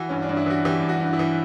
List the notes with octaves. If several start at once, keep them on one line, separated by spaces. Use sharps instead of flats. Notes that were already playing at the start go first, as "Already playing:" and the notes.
Already playing: E3 F#4
G2 C#4
D4
G2
E4
E3 F#4
E3 G4
G2
F#4
G2
E4
E3